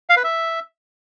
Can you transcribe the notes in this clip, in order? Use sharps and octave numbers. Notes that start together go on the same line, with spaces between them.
F5
B4
E5